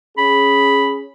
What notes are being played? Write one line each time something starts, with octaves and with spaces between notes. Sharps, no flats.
C#4 G#4 B5